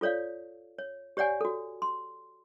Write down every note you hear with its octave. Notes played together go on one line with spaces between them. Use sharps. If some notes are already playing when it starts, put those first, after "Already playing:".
F4 A4 C#5 D5 F5
C#5
G4 C#5 D5 F#5 G#5
F#4 A4
C6